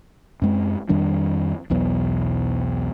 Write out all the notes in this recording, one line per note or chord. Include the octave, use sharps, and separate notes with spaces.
F#2 G#3 C4
F2 D#3 G3 D4
B1 E2 B2 F#3